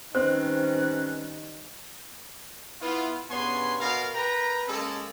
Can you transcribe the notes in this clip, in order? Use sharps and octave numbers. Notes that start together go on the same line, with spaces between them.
D#3 G3 C4 C#4 B4 C5 F#6
B3 E4 F4
G2 C#3 B3 C#5 G#5 C6
B2 A#4 F5
A#4 B4 G5 A#5
G#3 A#3 C#4 A4